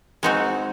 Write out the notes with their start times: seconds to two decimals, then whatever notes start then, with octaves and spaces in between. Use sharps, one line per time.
0.23 G#3 C4 D#4 F#4